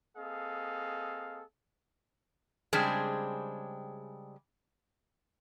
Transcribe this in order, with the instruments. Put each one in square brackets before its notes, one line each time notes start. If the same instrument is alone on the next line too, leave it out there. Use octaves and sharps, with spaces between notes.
[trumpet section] A#3 C4 G#4 A4 D#5 F5
[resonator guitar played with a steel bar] C#3 G3 G#3 C4 D4 G#4